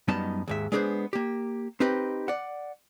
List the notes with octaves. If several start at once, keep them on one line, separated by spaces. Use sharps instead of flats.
F#2 G3 B3 D#4 D#5 A5
D#2 G#2 E5
G#3 B3 D4 G#4 A#4 C5
A#3 G4
C4 D#4 G4 B4
D5 F#5